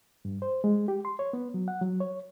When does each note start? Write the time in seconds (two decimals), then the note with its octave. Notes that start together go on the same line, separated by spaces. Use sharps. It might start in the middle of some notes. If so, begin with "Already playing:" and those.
0.25 G2
0.42 C5
0.64 G#3
0.88 G4
1.05 C6
1.19 C#5
1.33 B3
1.54 F#3
1.68 F#5
1.81 F#3
2.00 C#5